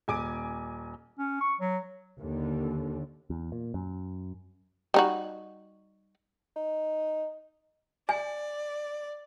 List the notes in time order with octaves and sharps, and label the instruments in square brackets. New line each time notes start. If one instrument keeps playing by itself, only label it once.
[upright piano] D#1 G#5 D6 D7
[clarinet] C#4
C#6
F#3
[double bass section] D#2 D3
[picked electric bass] E2
A#2
F#2
[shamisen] G3 D#4 F#4
[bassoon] D#4
[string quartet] D5 [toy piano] G#5